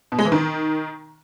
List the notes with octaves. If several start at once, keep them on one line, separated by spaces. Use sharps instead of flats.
B2
G#3
E3
D#3